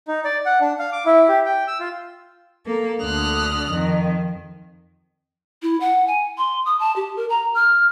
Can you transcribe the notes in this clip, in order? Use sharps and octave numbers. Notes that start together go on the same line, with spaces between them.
D#4
D5
F#5
D4
F5
D6
E4
G4
G5
E6
F4
A#3 A4
D2 D3 D#6 F6 F#6
F2 D#3
E4
F#5
G#5
C6
D#6
A5
G4
A#4
A#5
F6